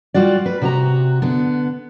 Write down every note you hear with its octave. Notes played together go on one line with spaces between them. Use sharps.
G3 F4 F#4 D5
B4
C3 F#4 A#5
D3 B3